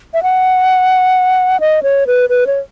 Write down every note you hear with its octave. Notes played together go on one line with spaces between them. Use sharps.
E5
F#5
D#5
C#5
B4
B4
C#5